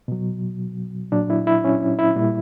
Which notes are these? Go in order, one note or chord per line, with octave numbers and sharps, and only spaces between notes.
B2 F#3
A#2 F#3 D4
E4
E4
C#4
E4
A#2 G3